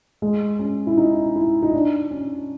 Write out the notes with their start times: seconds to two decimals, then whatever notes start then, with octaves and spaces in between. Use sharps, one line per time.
0.22 G#3
0.59 C#4
0.87 E4
0.97 D#4
1.36 E4
1.63 D#4
1.73 D4
2.11 C#4